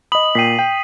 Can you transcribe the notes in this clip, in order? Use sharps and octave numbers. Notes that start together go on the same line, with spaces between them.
D#5 B5 D#6 F#7
A#2 G5 B6 C7 D#7
G5